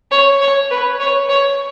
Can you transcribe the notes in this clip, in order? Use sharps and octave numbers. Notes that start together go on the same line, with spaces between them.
C#5
C#5
B4
C#5
C#5